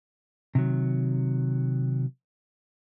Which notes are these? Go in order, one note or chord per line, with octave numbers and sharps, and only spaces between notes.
C3 D#3 F#3